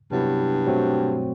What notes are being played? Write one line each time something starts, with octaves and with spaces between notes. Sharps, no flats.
G2 C3 F#3 B3 E4
B2 F#3 A3 C4 F#4